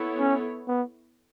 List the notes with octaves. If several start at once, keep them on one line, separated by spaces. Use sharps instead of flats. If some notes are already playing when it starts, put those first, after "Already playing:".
Already playing: B3 E4 A4 C#5
C#4
B3